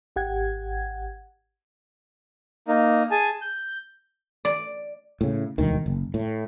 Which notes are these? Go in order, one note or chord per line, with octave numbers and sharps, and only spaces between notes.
G#1 G4 F#5 G#6
A#3 D#4
G#4 G#5 A5
G6
D5
A2 C#3
E1 D2 D#3
F#1
A2